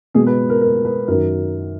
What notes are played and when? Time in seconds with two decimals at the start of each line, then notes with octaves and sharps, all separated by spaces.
0.15 B2 G#3 G#4
0.27 B4
0.50 A#4
0.61 A#4
0.85 B4
1.08 F#2 D#3 F#3 A#4